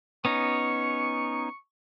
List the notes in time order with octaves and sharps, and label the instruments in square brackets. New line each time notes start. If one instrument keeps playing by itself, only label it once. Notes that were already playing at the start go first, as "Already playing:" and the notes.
[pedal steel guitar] B3 C#4 D#4 [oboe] C#6